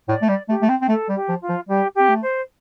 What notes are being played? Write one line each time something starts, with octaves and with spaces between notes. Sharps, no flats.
A2 D5
A3
G3 D5
A3 G4
A3
C4
C4
A3 A4
G3
G4
F3
F4
F3
G3 G4
G4
C4
A3
C5